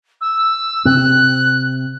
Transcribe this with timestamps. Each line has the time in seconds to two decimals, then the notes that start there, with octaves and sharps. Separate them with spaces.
0.21 E6
0.85 C3 C4 F#6